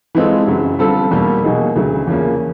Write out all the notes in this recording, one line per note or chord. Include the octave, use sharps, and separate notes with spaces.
E3 G#3 C4 F4 A4
F#2 C#3 F#3
D3 G3 C4 F4 A4
E2 B2 G3 A#3
B2 F#3 A#3 D#4 G#4
D2 C#3 F#3
E2 C#3 F3 A#3 C#4